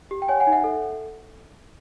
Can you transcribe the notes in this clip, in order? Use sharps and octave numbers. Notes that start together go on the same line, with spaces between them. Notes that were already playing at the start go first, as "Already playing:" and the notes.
G4
G5
C#5 F#5 G#5
F#5 G#5
D#4
E5 F#5
A4